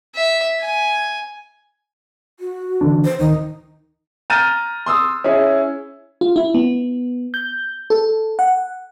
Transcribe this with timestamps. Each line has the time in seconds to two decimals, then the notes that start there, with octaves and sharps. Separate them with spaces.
0.15 E5
0.61 G#5
2.40 F#4
2.81 D3 E3 D4
3.04 C5
3.19 D1 D#3 D#4
4.30 A#5 F6 G6 A6 D#7
4.86 C6 D#6 E6
5.24 C#4 E4 G#4
6.21 F4
6.36 E4
6.54 B3
7.34 G6
7.90 A4
8.39 F#5